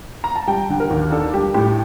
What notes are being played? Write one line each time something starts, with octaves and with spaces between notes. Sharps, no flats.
A#5
A5
G3 G5
D3
A#4
D#2
D4 A4
G3 G4
A2 G4